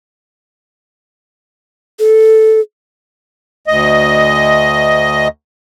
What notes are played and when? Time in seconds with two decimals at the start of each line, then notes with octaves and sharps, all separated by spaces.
2.00 A4
3.67 D2 D#5